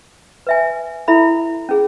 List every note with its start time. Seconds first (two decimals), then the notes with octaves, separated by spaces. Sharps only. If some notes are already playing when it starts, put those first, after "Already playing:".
0.47 B4 E5 G#5
1.08 E4 A4 E5 B5
1.69 C#4 G#4